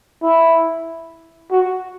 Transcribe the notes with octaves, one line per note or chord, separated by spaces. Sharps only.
E4
F#4